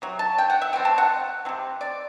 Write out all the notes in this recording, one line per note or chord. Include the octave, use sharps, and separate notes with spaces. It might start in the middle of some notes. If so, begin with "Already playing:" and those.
C3 F#3
A5
G5
F#5
E5
E3 A3 C4 G5
A5
F#5
C3 F#3 C4
D5